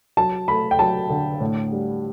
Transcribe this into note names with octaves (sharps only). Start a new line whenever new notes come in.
F#3 A5
A3 B5
G5
F#3 A5
D3
A2
G3